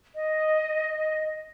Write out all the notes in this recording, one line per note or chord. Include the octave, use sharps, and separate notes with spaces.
D#5